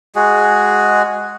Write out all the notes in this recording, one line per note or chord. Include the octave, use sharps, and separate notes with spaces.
G#3 F#4 G#4